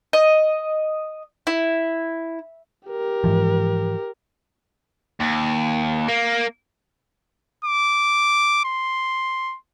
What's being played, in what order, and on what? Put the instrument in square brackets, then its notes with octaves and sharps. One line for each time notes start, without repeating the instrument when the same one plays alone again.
[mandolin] D#5
E4
[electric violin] G4 A#4
[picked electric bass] G#2 E3 F3
[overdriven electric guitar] D#2
A#3
[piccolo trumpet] D6
C6